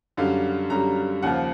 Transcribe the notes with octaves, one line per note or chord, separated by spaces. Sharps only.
F#2 D3 G3 F5
F#2 D3 G3 A#5
D#2 C#3 F3 F#5